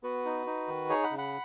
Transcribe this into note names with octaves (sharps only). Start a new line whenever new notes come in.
B3 F#4 B4
D#4
D#4
D#3
D#4 G#4 C#5
F#5 B5
C#3
F#5 B5